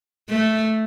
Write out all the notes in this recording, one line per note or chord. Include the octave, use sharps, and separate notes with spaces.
A3